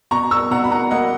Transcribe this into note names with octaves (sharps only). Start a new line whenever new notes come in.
B2 A#5 C#6
C#6 E6
B2 F#5 A#5
B5
F#5 A#5
A#3 D#5 F#5